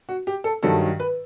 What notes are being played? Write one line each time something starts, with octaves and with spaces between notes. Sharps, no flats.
F#4
G4
A4
G2 D#3 F#3 A4
B4